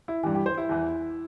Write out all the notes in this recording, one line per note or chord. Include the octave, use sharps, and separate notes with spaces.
E4
G2 E3 G4
G4
C5
E4
E2 E3